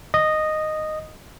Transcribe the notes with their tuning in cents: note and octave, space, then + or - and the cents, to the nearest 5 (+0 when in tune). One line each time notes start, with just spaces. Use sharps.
D#5 -10